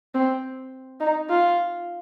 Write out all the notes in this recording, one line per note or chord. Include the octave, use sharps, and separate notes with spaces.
C4
D#4
F4